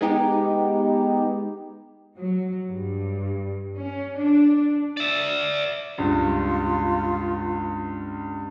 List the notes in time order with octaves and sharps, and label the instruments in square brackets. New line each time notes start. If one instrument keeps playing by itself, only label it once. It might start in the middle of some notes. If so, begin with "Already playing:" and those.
[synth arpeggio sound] G#3 B3 D#4 G4
[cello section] F#3
G2
C#4
D4
[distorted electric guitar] D5 E5
[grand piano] C#2 G2 [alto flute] F4